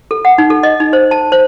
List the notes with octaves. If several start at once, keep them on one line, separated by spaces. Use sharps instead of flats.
A4
F#5
D#4
A4
D#5
D#4
C5
A5
C5